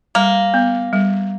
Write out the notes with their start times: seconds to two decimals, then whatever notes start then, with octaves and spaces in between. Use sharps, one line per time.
0.15 G3 A#3
0.54 B3
0.93 G3